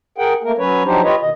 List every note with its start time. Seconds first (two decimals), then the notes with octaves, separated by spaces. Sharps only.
0.18 G#4 A#4 F#5 G5
0.43 A3 A#3 A#4
0.58 F#3 C#4 B4 C#5
0.85 F3 F#3 D4 D#4 G4 C5
1.03 F4 G4 B4 C#5 D#5
1.21 D#2 B2 D#3 D#5